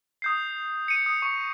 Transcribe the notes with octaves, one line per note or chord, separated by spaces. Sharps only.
D#6 G6 C7
C#7 D#7
D#6
C#6 C#7